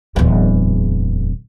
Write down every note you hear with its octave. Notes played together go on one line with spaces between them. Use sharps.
D1 E2